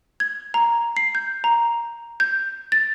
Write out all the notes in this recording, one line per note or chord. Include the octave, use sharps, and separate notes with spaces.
G#6
A#5
C7
G6
A#5
G6
A6